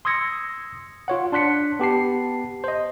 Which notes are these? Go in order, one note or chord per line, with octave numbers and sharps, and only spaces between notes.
C6 D#6 E6 G#6 A#6 C#7
F4 C#5 F#5
D4 C6 F#6 B6 C#7
B3 G4 A5 C7
C5 D#5